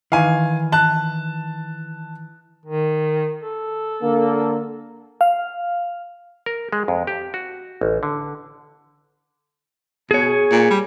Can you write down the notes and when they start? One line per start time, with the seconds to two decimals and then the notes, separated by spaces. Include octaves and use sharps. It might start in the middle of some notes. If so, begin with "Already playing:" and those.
0.12 D#3 E3 F5 G#5
0.72 A5 F#6
2.65 D#3
3.43 A4
4.02 D3 A#3
5.21 F5
6.46 A#4
6.73 G#3
6.88 F2
7.07 G4
7.34 F#4
7.81 A1
8.03 D3
10.11 B2 G#4 C#5
10.51 A#2
10.70 G3